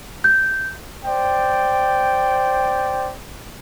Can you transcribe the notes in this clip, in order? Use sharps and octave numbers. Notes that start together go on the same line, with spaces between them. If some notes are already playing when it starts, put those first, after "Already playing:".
G6
C5 D5 G5